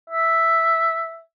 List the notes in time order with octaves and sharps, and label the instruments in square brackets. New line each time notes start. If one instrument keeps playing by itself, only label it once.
[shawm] E5